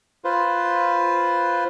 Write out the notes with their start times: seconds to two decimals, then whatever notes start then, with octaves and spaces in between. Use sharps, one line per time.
0.24 F4 B4 C5